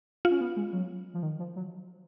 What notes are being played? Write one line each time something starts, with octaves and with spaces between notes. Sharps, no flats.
F4
C#4
B3
G#3
F#3
F3
D#3
F3
F#3